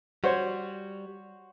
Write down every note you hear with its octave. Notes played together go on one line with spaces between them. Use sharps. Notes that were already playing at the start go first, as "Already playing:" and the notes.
G3 F#4 C5 C#5